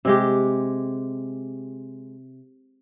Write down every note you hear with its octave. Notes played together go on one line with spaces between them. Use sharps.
C3 G#3 G4